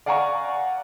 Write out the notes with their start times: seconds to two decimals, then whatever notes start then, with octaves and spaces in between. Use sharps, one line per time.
0.06 D5 F5 F#5 G#5 A#5 C#6